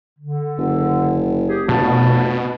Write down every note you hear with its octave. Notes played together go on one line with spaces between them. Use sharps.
D3
F#1
G4 G#4
F1 B2 A5